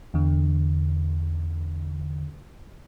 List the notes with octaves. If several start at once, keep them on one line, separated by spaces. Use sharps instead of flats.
E2 D3